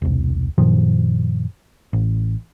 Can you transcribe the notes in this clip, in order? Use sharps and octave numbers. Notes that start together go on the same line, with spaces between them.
E1 C2
F#2 A#2 D#3 F3
A1